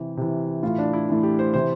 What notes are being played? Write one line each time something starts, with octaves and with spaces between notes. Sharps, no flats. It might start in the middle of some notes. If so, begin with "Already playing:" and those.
Already playing: C3 E3 G4
C3 E3
A2 E3 F4
D4
E4
A2 E3
G4
C5
C3 E3 C5